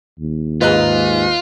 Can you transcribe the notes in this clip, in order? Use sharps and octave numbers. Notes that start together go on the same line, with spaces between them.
D#2
G#2 F4 B4 D#5 F#6